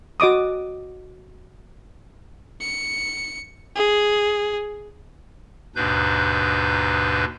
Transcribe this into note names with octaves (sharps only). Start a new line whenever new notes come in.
F#4 D#5 D6 D#6
C#7
G#4
D#2 G#2 B2 D4 B4 G6